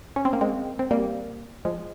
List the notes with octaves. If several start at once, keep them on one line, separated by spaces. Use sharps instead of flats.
C#4
C4
A#3
G#3 C4
C4
G3 A#3
F3 G#3